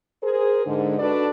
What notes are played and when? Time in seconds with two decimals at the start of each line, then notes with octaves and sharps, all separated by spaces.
0.22 G#4 A#4 C5
0.66 G#2 D3
0.98 D4 F#4 A4 B4 D5